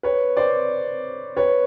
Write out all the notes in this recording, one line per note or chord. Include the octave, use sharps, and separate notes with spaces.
B4 C#5
C5 D5
B4 C#5